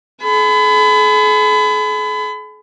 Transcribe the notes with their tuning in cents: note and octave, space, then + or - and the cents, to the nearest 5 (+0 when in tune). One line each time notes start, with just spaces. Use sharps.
G#4 +45 B5 +30